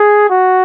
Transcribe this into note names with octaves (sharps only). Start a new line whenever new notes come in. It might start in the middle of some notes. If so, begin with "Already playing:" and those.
Already playing: G#4
F#4